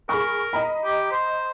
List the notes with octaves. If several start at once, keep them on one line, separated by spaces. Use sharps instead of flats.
G#4 A#4 B5 C#6
D#5 A#5 B5
G4
C5